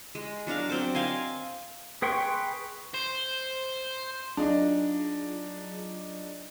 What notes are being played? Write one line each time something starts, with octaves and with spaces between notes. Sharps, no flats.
G#3
F#3 D4 A#4 F5
F#3 C4 C5 D6
D#5 F5 G#5 C6
G#4 B4 G5 C6 C#6
C5
F#3 D4 D#4 F4 G#4